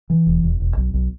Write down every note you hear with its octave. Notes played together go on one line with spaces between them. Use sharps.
E3
E1
E1
E1
B1
B1